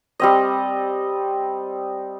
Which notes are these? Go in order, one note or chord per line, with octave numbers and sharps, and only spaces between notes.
G3 C4 D#5